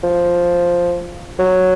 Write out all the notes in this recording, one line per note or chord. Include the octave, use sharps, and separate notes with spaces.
F3
F#3